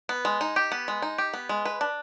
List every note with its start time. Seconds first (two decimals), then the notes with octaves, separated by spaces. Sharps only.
0.09 B3
0.25 G#3
0.41 D#4
0.56 G4
0.72 B3
0.88 G#3
1.02 D#4
1.18 G4
1.34 B3
1.49 G#3
1.65 B4
1.81 D4